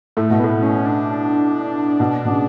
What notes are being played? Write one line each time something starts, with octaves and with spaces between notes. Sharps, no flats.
A2 A3
B2
A2 B3
C#4
D4
B2
B2
C#3